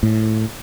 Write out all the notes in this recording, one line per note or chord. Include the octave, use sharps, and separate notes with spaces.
A2